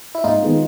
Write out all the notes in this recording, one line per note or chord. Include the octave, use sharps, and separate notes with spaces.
E4
G#2 D#4 F4
D#3 G#3 B3